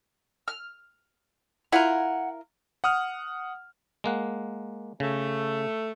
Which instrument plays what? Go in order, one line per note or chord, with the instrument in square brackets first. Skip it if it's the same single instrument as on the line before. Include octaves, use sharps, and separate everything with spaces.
[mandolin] F6
[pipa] E4 F4 A#4 [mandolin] F#5 G#5
[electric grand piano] F#5 D#6 F6
[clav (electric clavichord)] G#3 A#3 F#5
[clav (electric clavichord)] C#3 [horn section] A3